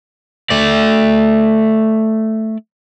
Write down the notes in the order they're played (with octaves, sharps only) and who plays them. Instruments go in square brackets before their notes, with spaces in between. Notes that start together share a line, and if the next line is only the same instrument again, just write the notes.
[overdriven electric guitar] A3 D5